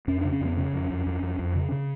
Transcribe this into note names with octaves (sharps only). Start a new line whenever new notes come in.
F2 C#4
C#3 D4
C#4
F2 B3
C#3 C#4
F2
F2
F2
F2
F2
C#3
C#3